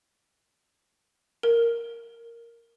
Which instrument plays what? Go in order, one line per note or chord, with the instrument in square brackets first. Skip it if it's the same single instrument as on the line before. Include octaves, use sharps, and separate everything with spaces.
[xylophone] A#4